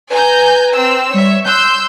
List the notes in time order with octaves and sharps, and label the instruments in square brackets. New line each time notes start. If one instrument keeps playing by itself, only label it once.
[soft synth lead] B4 [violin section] G#5 A#5 G6
[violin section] C4 E6
[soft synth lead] G3 [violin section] C#5 E5
[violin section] C6 E6 G6 [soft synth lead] F#6